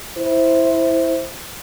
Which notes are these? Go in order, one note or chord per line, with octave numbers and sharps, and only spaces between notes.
E4 C5